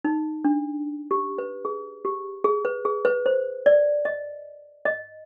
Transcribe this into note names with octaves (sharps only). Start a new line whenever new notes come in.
D#4
D4
G4
B4
G#4
G4
G#4
B4
G#4
B4
C5
D5
D#5
D#5